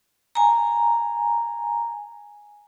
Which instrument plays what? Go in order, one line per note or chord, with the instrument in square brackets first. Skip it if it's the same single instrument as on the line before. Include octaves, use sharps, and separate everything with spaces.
[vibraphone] G#5 A#5